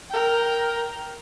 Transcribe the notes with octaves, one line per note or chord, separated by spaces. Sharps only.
A#4 G5